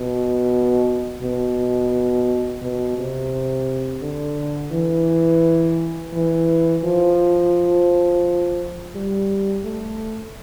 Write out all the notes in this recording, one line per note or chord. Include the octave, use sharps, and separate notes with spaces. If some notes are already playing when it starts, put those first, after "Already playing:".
Already playing: B2
B2
B2
C3
D3
E3
E3
F3
G3
A3